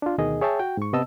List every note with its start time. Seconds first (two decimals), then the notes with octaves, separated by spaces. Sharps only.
0.02 D4 F4
0.18 D2 B2 D#3 G#4 D#5
0.41 G#4 C#5 E5 G5 A5
0.60 F#4 G5
0.77 G#2 C#6
0.93 C3 B3 D#5 A5 E6